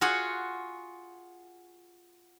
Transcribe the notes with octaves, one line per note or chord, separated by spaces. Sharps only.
F4 F#4 G#4 F#5